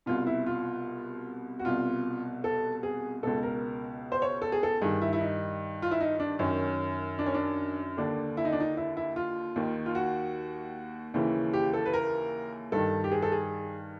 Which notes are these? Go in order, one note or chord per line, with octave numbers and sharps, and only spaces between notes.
C2 B2 F4
E4
F4
F#4
C2 B2 F4
A4
G#4
C#2 B2 A4
A#4
C5
C#5
A4
G#4
A4
G2 D#3 G#4
E4
E4
D#4
F4
E4
D#4
D4
F#2 D#3 C#4
D4
C#4
D4
D#2 D3 D4
E4
D#4
D4
D#4
E4
E4
F4
D#2 D#3
F4
F#4
D#2 C#3 E3
G4
A4
B4
A#4
G2 D#3 A4
G4
G#4
A4
G#4